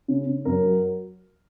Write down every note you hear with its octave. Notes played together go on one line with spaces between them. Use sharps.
C#3
C#3
F#2 A#4
F#3